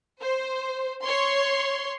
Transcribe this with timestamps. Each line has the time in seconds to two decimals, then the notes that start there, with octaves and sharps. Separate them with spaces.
0.21 C5
1.03 C#5 C6